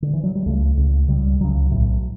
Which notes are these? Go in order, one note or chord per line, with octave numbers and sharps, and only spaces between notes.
D3
E3
F#3
G3
C#2 C#3 A3
C#2 C#3
C#2 C#3 G3
C#2 C#3 F#3
B1 A2